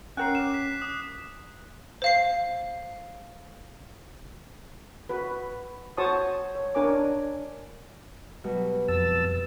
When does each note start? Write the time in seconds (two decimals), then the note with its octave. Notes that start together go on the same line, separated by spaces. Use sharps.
0.17 C#4 A#4 F#5 G5 F#6 C7
0.35 D6 E7
0.54 B6
0.82 D#6
2.02 C5 F5 C7
5.09 F#4 B4
5.97 F#4 C5 C#5 A5 C#6 D#6
6.55 C#5
6.75 D4 A#4 C#5 G#5 D6
8.44 B2 F#3 G3
8.88 F2 A5 E6